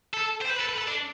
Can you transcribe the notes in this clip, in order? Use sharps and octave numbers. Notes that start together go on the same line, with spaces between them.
A4
C5
B4
A4
B4
A4
D4